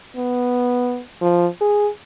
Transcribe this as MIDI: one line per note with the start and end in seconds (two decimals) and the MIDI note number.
0.16 1.01 59
1.21 1.47 53
1.61 1.89 68